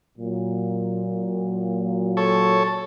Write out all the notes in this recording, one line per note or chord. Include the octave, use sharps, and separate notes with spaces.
A#2 F#3
A4 C#5